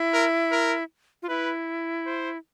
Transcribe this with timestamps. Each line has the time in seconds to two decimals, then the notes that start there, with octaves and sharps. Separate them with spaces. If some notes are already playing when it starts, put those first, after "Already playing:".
Already playing: E4
0.14 A#4
0.52 A#4
1.22 F4
1.29 E4 B4
2.07 C5